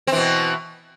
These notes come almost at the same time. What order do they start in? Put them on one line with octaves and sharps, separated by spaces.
C4 E3 B2